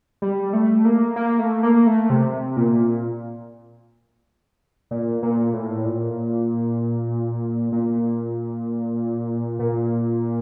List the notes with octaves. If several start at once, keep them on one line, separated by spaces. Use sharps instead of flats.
G3
A3
A#3
A#3
A3
A#3
A3
C3
A#2
A#2
A#2
A2
A#2
A#2
A#2